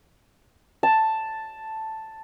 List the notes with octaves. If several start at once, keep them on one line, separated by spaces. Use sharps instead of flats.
A5